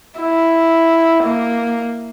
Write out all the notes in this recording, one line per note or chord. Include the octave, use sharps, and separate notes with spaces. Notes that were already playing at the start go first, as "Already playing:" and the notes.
E4
A#3